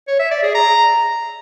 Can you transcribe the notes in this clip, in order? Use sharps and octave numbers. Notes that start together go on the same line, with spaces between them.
C#5
E5
D5
G#4
A#5